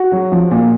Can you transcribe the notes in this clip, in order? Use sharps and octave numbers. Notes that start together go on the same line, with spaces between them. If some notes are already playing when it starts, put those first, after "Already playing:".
Already playing: F#4
F#3
F3
A#2